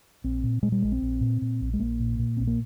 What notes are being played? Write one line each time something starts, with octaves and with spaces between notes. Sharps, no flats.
A#1 C4
A#2
A#2 G#3
G3
A#1 G#3
C4
A#1
A#2
A#2
A#1
G#3
A#1 A#3
A#2
A#2
A#1 C4
A#3